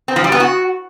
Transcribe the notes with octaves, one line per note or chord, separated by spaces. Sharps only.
C4
F3
G3
B3
F#4